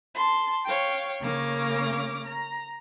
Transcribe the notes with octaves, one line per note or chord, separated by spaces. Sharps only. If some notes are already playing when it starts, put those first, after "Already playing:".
A5 C6
C#5 F5 G5
C#3 A#3 C#5 D6 F6 A#6
A#5